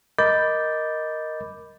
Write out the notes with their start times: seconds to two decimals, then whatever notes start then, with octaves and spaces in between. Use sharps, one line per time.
0.19 A#4 D#5 B5 D6 G6 A6